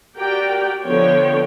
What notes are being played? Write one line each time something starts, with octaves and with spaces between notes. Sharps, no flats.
F#4 G4 A#4 D5 G5
D3 F3 B3 C#5 G5